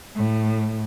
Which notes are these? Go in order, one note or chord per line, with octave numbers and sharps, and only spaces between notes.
A2